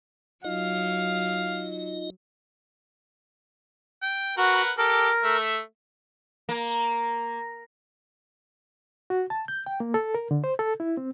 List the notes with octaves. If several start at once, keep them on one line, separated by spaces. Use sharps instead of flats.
F#3 D#4 F4 D#5 F5
G5
F#4 A#4 B4 F#5
G4 A4 A#4
A3 E5
A#3
F#4
A5
G6
G5
A#3
A4
A#4
D3
C5
A4
E4
C4